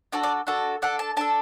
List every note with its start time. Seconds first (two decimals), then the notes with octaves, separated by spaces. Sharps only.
0.12 D4 F#4 A4 D5
0.23 D5
0.47 D4 F#4 A4
0.82 D4 A4 F#5
0.99 A5
1.17 D4 A4 A5